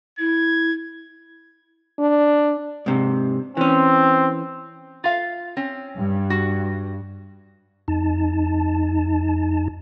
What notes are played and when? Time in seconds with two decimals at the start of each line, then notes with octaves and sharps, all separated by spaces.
0.19 E4 G#6
1.99 D4
2.86 G#2 C3
3.57 E3 C4 C#4
5.04 F4 F5
5.57 C4 C#4
5.98 G2
6.30 F#4
7.88 F2 D#4 A5